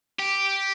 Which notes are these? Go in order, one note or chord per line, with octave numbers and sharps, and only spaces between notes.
G4